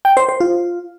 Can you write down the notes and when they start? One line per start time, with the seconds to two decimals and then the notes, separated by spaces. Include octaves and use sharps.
0.05 G5
0.17 C5
0.29 C5
0.40 F4